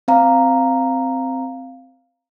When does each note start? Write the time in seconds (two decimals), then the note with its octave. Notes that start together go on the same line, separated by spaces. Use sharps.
0.08 C4 F5 A#5